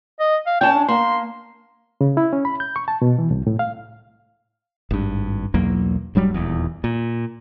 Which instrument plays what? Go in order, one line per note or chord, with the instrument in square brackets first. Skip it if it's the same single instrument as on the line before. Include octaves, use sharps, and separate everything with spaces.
[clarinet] D#5
F5
[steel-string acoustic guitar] C#4 A5 [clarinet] G5
[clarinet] D4
[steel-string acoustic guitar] A#3 [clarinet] C6
[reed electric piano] C#3
E4
C#4
B5
G6
C#6
A5
B2
E3
C2
A2
F5
[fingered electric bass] G#1 G2
B1 E2 F#3 A#3
D1 G2 F#3 G3
D#1 E2
A#2